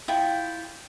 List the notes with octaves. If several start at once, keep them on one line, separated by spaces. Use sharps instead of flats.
E4 F4 G5